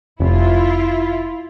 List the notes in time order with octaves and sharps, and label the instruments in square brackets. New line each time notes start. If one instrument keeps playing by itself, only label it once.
[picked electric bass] F1 [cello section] E4 F4